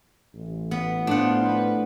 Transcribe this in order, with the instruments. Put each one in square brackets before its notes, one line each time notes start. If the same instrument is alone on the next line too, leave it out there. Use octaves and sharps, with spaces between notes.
[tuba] A1
[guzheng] B3
[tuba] A2 [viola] F3 B3 [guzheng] D4 F#5
[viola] B4